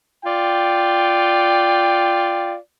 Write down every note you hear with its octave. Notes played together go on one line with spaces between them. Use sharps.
F4 D5 G5